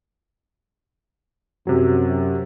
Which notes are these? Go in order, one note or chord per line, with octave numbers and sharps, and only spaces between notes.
F#2 C3 F#3